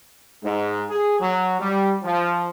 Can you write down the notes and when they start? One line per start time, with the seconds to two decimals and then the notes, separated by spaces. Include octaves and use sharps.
0.42 G#2
0.90 G#4
1.19 F#3
1.60 G3
2.03 F3